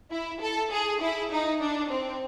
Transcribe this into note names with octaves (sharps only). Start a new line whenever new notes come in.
E4
A4
G#4
E4
D#4
D4
C4